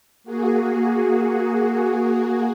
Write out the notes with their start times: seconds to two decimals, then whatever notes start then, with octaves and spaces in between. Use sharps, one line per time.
0.24 A#3 F#4 G#4